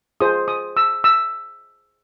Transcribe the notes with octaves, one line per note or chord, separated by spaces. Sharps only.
F4 G#4 C5 D#6
D#6
E6
E6